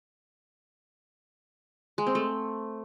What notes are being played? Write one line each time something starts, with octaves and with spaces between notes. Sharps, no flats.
G#3
C4
A3